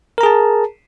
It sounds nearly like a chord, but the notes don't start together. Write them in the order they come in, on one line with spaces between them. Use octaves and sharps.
A#4 A#5 G#4 A5